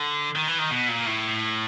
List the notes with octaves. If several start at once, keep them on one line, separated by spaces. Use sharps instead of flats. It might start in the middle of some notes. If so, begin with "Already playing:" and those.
Already playing: D3
D#3
E3
D#3
B2
A#2
A2